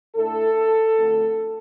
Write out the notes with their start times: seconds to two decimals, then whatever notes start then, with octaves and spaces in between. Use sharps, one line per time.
0.16 A2 A3 D4 A4
0.96 F2 D3 A3